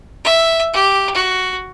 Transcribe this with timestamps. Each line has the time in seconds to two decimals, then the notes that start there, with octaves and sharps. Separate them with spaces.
0.24 E5
0.73 G4
1.14 F#4